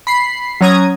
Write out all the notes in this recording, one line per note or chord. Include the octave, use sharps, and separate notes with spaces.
B5 C7
F#3 C#4 A#5 D#6 G#6